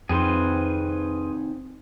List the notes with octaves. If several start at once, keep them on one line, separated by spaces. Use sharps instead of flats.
F2 C3 D#3 C4 G#4 B4 C5